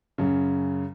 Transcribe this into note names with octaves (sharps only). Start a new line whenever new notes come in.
F#2 C#3